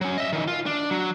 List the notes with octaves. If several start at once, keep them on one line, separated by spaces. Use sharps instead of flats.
F#3 C#4
D#5 E5
D#3 E3
F4
D4
F#3